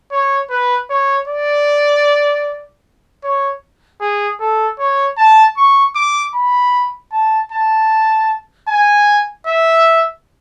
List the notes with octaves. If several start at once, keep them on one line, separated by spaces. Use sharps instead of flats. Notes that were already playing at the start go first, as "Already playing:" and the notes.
C#5
B4
C#5
D5
C#5
G#4
A4
C#5
A5
C#6
D6
B5
A5
A5
G#5
E5